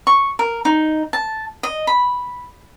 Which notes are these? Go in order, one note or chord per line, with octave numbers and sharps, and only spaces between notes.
C#6
A#4
D#4
A5
D#5
B5